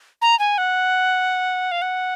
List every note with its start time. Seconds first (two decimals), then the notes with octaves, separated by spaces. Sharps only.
0.22 A#5
0.39 G#5
0.58 F#5
1.71 F5
1.82 F#5